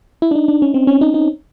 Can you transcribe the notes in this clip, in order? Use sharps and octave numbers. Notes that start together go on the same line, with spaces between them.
E4
D4
D#4
D4
C#4
C4
C#4
D#4
D#4